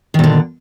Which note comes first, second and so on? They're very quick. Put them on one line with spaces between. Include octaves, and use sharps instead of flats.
D#3 A#2 D3